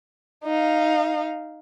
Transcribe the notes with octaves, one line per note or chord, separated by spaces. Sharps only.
D#4 F5